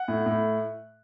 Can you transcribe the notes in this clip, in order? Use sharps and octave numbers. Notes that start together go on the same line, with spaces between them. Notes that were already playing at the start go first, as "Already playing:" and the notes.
Already playing: F#5
A2
A2